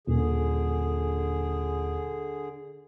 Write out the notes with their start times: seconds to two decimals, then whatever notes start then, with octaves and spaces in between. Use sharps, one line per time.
0.07 D#1 D3 G#4